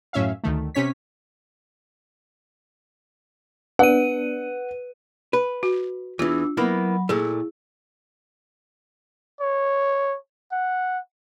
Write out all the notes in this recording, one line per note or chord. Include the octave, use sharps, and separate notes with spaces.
F#2 A2 C#4 E5 F5
D2 D#3 A3
C3 C#4 C#5 B6
B3 D4 B4 F#5 D#7
B4
F#4
E2 E3 D4 F4 E6
F#3 A#3 B3 E4 F#5 B5
A#2 A3 E4 G#4
C#5
F#5